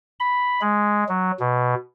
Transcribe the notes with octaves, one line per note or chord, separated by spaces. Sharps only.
B5
G#3
F#3
B2